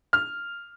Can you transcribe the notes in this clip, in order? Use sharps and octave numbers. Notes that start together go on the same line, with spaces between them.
F6